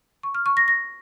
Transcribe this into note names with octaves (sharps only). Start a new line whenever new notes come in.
C#6
F6
C#6
A#6
A#6